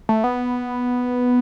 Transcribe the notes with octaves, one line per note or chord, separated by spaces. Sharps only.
A3
B3